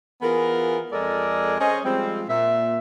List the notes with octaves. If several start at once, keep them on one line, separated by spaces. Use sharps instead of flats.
E3 B3 F4 G#4 A#4
F2 G#3 A4 A#4 D5 D#5
C#4 G#4 C5 C#5 D#5
F3 G3 G#3 C4
A#2 E5